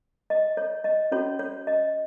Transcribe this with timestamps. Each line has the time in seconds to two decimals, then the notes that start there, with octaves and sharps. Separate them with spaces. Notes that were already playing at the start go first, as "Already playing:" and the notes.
0.30 D#5
0.57 C#5
0.84 D#5
1.12 C#4 F#4 C#5
1.39 C#5
1.67 D#5